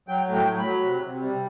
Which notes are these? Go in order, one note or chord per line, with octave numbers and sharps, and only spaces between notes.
F#3 G5
A2
G5
F#3
B5
F#3
C3
C3
G3